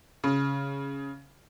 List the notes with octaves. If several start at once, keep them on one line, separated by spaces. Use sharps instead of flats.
C#3